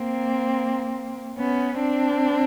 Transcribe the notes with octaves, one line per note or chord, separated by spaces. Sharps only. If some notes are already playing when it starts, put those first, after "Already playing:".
Already playing: A#3 C4
B3 C#4
C4 D4